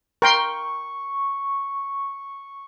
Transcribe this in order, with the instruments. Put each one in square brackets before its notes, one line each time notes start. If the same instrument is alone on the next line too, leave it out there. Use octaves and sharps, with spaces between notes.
[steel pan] A#4 G5 C6 [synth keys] C#6